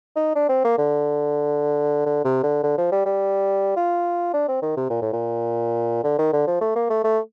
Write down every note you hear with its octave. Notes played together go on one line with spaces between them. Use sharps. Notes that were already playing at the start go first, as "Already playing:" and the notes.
D#4
D4
C4
A#3
D3
D3
C3
D3
D3
F3
G3
G3
F4
D4
C4
D#3
C3
A#2
A2
A#2
D3
D#3
D3
F3
A3
A#3
A3
A3